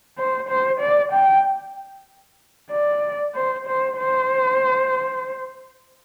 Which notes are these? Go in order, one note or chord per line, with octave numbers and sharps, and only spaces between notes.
C5
C5
D5
G5
D5
C5
C5
C5